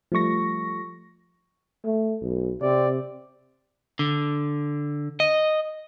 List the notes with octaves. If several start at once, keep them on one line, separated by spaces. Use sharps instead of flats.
F3 G3 A3 C#6 A#6
A3
B1
C3 C4 D5
D3
D#5